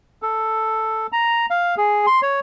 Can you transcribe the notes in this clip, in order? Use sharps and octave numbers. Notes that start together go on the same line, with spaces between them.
A4
A#5
F5
G#4
C6
C#5